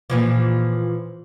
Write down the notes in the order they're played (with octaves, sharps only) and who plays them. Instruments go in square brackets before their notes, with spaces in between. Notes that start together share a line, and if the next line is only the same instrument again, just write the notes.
[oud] A#2 E3 F3